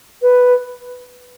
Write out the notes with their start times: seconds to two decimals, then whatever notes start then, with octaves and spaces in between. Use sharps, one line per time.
0.22 B4